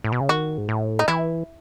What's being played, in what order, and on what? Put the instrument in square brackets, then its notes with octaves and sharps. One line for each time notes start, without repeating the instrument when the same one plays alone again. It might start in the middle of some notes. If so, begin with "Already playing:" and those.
[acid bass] A2
B2
C#3
[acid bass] D#3 [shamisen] F#4
[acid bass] G#2
A2
[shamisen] D#4
[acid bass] E3 [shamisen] E4